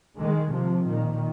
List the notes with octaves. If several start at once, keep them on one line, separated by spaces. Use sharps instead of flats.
D#3 G#3
C3 F3
A#2 D#3